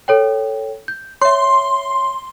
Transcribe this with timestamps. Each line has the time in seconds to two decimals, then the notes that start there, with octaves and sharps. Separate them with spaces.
0.08 A4 C#5 G5
0.88 G6
1.22 C#5 E5 C6